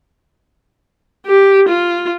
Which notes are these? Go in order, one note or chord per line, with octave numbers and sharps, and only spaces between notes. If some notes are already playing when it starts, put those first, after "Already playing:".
G4
F4